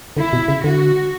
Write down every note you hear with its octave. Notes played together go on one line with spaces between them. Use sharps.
D3 E4
B2
C#3
D3 F#4